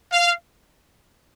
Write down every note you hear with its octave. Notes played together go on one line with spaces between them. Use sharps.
F5